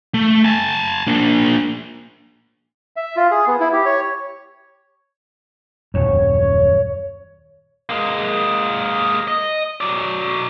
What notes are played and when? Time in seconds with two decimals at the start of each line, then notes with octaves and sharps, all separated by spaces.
0.14 A3
0.45 G#5 A5
1.07 A#3 D4
2.96 E5
3.16 F4
3.31 G#4
3.47 B3
3.60 E4
3.73 G4
3.85 C#5
5.94 D#1 F#2 C#5
7.89 G#3 A#3
9.28 D#5
9.81 F#3 D5